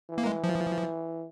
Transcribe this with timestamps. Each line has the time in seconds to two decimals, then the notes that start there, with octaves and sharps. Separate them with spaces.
0.10 E3
0.18 A#3
0.26 G#3
0.44 F3